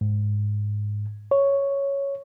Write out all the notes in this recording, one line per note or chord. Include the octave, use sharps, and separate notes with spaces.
G#2
C#5